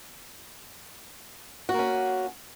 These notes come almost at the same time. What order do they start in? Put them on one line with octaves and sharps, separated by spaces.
F#4 A#3 C#4